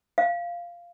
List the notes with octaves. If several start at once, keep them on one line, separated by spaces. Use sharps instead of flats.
F5